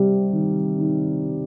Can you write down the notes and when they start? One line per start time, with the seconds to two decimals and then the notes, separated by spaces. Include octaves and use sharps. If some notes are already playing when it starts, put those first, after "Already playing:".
Already playing: C3 G3
0.33 D#3
0.78 D#3